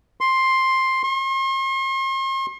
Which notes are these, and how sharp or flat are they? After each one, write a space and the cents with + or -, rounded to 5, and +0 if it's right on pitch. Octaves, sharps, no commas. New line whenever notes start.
C6 +10
C6 +45